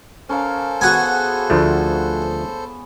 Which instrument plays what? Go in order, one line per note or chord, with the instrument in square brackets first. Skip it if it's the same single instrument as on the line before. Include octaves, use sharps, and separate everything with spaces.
[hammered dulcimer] C#4 A#4 F5 [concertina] A4 C5
[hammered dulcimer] B3 G#4 [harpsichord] F#4 G#5
[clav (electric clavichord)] D2 F3 A3